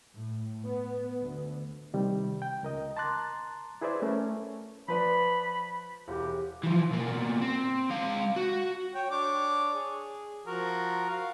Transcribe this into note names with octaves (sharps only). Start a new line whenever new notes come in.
A2
B3
D2
C3 D#3 G3
G5
C#2 A#4 D#5
A5 A#5 C6 D6 F#6 A6
E4 G#4 B4 C5 D5 E5
A3 C#4 A#4
F3 B4 D5 B5
E1 G4
E3 F3
B2 A#3
C4
G#3 F5
F#4
C#5 G5
D4 C#5 D6
G#4
F3 F#4 A#4
F#4 F5